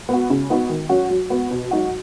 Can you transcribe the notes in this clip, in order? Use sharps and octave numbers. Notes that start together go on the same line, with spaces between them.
B3 F#4
C#3
B3 D#4 F#4
D#3
F#3 C#4 F#4
F#3
B3 F#4
B2
F#3 D#4 F#4